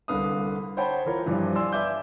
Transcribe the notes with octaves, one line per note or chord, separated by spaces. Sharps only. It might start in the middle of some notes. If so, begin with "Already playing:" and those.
C2 D3 B4 F5 D#6
C5 C#5 F#5 G5 A5 B5
E3 F4 A#4 C#5
G2 E3 F3 G3 D4 F4
D5 F5 G#5 C6 E6
B4 D5 E5 G#5 D6 G6